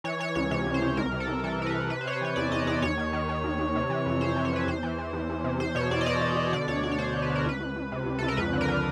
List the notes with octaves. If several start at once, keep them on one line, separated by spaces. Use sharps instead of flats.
E3 C#5
E3 C#5
C#2 C#5
C3 C#5
C#2
C5
C#2
C2 A#4
C3
A4
C2
E3 A4
C3 A#4
B4
C3
C3 B4
C5
C3 C#5
C5
E3 C#5
E2 D5
E2 D#5
E2 D5
D#2 C#5
D#3
D#3
D#3
D#2
D#2
C3
E3
F2
F2 C5
E3
C#5
C3 B4
E2 C5
E3
E3
E2
E2
C3
E2 C5
B2 C#5
E2 D5
D#5
B2 D5
B2
B2
D3 D5
D2 C#5
D2 D5
C#5
D3 C5
D3
B4
D3
A#4
C#2 B4
C#2
C#2
C3
C#2
C#2 A4
A#4
F2 B4
D3
A#4
D3